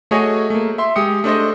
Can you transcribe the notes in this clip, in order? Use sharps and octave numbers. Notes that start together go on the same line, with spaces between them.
A3 F#4 G#4 C#5 D#5 G#5
A3 A#3
E5 C6
G#3 G4 D#6 C#7
A3 D4 C5 D#5